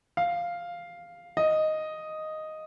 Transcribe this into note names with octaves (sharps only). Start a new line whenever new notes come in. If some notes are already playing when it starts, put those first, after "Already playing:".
F5
D#5